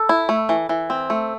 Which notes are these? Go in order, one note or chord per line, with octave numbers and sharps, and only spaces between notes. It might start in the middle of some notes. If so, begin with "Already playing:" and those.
Already playing: A4
E4
A3
E3
E3
C4
A3